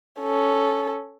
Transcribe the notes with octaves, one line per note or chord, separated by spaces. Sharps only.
C#4 A4